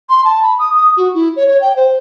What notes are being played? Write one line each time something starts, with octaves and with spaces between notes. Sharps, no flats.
C6
A5
B5
D#6
D#6
F#4
E4
C#5
C#5
G5
C5